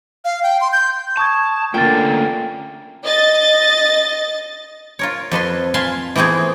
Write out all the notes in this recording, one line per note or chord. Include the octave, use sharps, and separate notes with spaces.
F5
G5
C6
G6
A5 C#6 D#6 G#6
D3 A3 A#3 C#4 F4 A#4 G5 A6
D#5 A6
F4 A#4 C#5
F2 A4 B4 C6
F5 G#5 A5 B5 C6
E3 A3 B3 C4 G#4